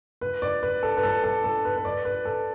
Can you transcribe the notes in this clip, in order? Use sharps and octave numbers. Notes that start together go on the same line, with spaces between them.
B4
D5
B4
A4
B4
A4
A4
A4
B4
B4
D5
B4
A4